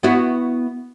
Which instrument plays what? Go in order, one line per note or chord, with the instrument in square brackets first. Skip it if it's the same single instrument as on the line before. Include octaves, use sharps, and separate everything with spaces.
[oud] B3 E4 F#4